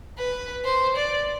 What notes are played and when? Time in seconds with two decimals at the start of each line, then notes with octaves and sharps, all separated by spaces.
0.18 B4
0.65 C5
0.96 D5